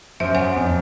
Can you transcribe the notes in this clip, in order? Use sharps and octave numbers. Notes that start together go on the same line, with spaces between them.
F#2 C5 E5 D7
C#5 F#5 G#5
F2